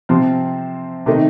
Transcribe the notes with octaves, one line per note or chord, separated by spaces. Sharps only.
C3 F3 C4
C3 D#3 A3 D#4